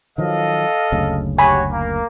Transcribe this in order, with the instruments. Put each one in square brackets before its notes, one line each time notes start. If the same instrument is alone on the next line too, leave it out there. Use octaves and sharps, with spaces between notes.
[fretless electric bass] D#3 F3 F#3 [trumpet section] A4 D#5 F5
[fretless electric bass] F#1 D2 C#3
[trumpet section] F#4 G4 C#5 [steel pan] G#5 B5
[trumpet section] A#3